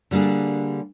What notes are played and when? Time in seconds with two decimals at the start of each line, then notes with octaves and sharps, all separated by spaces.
0.11 D3 G3 A#3 D4 G#4